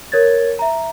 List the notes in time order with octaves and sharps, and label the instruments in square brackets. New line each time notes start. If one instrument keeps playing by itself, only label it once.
[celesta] A#4 C#5 G#6 A6
E5 A#5